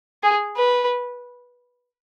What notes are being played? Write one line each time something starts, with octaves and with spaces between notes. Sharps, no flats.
G#4
B4